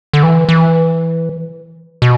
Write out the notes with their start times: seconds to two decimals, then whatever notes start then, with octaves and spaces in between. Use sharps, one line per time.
0.13 D3
0.23 E3
0.49 E3
2.02 B2